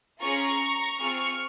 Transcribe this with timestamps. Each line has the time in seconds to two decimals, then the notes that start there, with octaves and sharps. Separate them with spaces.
0.21 C#4 F4 G#4 A#5 C#6
0.99 C4 F4 G#4 C#6 F6